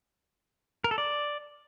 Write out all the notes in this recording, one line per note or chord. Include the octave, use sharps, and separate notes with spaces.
A#4
A4
D5